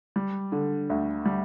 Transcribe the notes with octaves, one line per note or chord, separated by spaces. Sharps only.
G3
D3
D2
G3